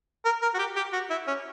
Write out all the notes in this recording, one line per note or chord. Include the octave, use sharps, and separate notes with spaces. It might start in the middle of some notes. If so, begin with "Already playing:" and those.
A#4
A#4
F#4
G4
G4
F#4
E4
C#4